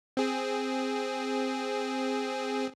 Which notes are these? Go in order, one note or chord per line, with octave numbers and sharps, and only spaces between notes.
C4 G#4